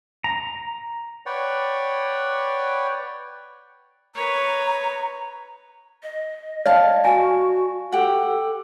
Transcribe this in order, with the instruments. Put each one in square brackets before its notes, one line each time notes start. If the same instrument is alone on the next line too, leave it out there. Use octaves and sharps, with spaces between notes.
[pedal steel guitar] A#5
[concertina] B4 C#5 D5 F#5 G5
[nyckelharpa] B4 C#5 [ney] A#5
[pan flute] D#5
[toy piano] D5 [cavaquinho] F5 A5
[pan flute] F#4 [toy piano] G#5
[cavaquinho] G4 F#5 [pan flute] A4